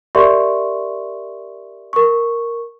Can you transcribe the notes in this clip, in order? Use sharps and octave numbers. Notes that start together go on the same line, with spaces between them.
G4 A#4 D5 E5 C6 C#6
A#4 C#6